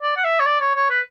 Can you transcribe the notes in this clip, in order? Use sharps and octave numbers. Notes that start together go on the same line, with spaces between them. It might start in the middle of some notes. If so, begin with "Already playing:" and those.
D5
F#5
E5
C#5
D5
C#5
C#5
B4